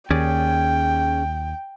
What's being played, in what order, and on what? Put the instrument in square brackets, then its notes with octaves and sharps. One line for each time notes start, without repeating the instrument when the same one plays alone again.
[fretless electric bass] D#2 [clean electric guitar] C#4 G#4 D5 [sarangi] G5